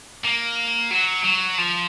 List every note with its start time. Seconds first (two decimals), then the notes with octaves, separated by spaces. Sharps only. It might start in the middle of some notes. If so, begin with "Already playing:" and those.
0.24 A#3
0.91 F#3
1.24 F#3
1.58 F3